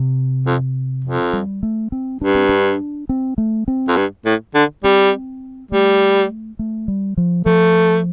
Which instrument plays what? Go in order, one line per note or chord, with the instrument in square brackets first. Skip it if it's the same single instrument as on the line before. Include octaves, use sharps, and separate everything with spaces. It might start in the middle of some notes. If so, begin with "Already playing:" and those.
Already playing: [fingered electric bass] C3
[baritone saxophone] F2
F2
[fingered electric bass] G3
A3
C4
[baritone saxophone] G2 [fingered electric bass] D4
[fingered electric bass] C4
D4
C4
A3
C4
[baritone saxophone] F2
G2
A2
D3
[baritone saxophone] G3 [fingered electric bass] C4
[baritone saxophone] G3 [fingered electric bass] A3
[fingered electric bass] A3
G3
F3
[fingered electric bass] F3 [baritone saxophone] A3